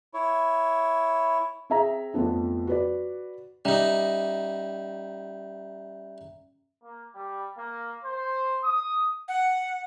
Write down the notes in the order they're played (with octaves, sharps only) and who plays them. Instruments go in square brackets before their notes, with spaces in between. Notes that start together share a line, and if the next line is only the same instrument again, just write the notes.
[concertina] E4 C#5
[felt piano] C4 G#4 E5 A#5
F2 F3 A3 B3 D4
F#4 B4 D5
[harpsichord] G3 D#4 [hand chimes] C#4 E5 A#5
[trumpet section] A#3
G3
A#3
C5
D#6
[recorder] F#5